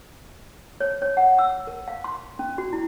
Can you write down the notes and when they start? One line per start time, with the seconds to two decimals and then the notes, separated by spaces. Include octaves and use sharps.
0.81 C#5
1.02 C#5
1.17 F#5
1.39 E6
1.67 A#4
1.88 F5
2.04 C6
2.39 C#4
2.58 F#4
2.73 E4